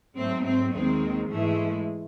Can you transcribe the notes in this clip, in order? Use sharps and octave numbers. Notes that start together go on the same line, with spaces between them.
G#2 F#3 A3 C4
C4
D#2 D#3 G#3 C4
G#2 E3 G#3 A3